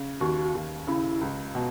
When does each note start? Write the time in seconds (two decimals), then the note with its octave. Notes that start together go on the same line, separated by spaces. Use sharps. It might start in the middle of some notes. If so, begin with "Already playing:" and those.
Already playing: C#3
0.21 D#2 F#4
0.55 D#2
0.87 C#3 E4
1.21 C#2
1.55 B2